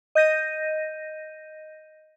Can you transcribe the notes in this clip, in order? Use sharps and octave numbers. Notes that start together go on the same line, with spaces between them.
D#5 G6 A#6 D#7